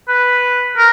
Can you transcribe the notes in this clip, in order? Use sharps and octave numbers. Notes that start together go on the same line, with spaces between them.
B4
A#4